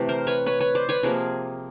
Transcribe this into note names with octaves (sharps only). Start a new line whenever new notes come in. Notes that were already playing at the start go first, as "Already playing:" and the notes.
Already playing: C3 E3 A3 G4
A#4 C5
B4 C#5
B4 C#5
B4 C#5
C5 D5
B4 C#5
C3 F3 A#3 G#4 A#4